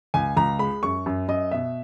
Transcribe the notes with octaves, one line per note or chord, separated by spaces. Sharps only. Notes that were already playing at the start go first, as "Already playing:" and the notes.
C#2 G#5
C#2 A#5
G#3 B5
F#2 C#6
F#2
F#2 D#5
B2 E5